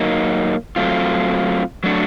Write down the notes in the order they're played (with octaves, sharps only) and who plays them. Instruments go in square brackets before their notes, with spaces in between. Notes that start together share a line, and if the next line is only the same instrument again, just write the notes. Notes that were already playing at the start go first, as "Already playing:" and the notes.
Already playing: [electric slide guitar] F#3 A#3 D#4
F#3 A3 C4 F4
F#3 A3 D4 F#4